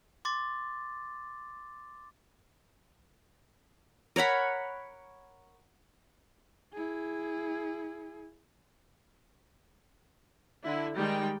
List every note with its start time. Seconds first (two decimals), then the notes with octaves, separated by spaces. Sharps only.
0.25 C6 D6 A6
4.16 A#4 C#5 F#5 B5
6.73 E4 G#4
10.64 D3 E4
10.96 D#3 G3 G#3 D#4 G5